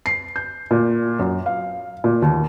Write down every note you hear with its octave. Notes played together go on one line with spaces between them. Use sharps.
C7
G6
A#2
F#2
F5
A#2
D#2